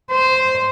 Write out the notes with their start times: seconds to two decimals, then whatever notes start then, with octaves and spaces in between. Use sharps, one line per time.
0.11 C5